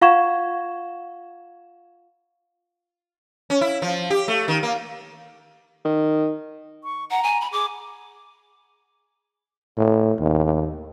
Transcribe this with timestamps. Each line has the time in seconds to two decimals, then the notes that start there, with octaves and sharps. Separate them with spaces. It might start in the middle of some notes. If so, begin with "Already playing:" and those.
0.02 F4 F5 F#5 C#6 G#6 E7
3.50 C#4
3.61 E4
3.82 F3
4.10 G4
4.28 A3
4.48 D#3
4.63 A#3
5.85 D#3
6.84 C#6
7.11 F#5 A#5
7.24 G#5
7.41 B5
7.52 G#4 D6
9.78 A2
10.20 D#2